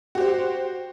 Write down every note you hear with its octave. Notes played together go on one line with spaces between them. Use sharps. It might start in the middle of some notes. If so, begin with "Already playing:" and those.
F#4 G4 C5